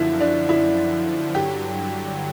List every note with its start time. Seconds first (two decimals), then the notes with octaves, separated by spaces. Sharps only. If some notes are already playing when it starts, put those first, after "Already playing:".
Already playing: F#2 D3 F3 E4 F#4
0.20 D4
0.49 E4
1.35 G2 D3 F#3 G4